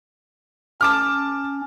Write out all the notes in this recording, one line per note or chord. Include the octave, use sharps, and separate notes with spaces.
C#4 A5 D6 F6